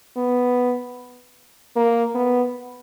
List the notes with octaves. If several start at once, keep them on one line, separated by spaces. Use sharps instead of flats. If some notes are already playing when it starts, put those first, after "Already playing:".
B3
A#3
B3